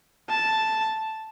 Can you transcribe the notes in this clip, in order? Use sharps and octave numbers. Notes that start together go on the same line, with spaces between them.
A5